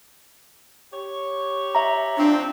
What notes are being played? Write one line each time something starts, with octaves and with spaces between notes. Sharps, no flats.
G4 C#5
E5 A#5
F3 C4 D4